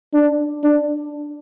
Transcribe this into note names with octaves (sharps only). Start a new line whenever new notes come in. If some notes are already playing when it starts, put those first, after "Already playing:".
D4
D4